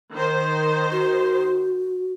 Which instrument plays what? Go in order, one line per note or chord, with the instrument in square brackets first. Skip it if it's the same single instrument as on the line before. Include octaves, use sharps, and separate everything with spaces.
[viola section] D#3 C5
[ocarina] F#4